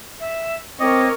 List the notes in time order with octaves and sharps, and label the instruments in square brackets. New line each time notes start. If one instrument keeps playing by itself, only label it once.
[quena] E5
[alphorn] C4 [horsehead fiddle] A#4 C#5 [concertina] D#5 [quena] D6